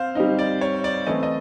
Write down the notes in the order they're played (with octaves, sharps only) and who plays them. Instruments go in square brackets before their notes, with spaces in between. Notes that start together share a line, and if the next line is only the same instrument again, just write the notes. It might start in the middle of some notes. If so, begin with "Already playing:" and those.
Already playing: [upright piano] C4 [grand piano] C5 F5
[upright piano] G3 C4 D#4
[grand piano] D5
C#5
D5
[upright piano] E3 A3 C4 [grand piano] D#5
[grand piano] D#5